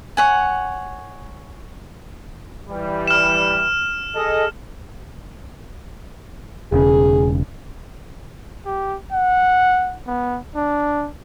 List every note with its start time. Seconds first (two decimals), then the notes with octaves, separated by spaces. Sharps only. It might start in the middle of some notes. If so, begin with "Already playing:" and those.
0.17 C#5 F#5 G#5
2.69 E3 G3
3.08 F6 E7
4.15 G#4 A4 D#5
6.72 E1 C#3 G#4
8.66 G4
9.12 F#5
10.07 B3
10.56 D4